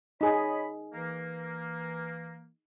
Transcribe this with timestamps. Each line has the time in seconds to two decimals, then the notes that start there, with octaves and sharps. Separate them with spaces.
0.21 D#4 G#4 C#5 D#5 B5
0.93 E3 A#3